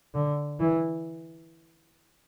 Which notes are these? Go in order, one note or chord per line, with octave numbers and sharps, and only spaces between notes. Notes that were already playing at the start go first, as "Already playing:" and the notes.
D3
E3